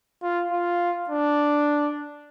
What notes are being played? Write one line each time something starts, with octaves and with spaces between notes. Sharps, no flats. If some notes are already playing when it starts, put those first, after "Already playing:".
F4
F4
D4